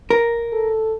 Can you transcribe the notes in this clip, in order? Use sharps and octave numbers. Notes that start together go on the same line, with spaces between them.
A#4
A4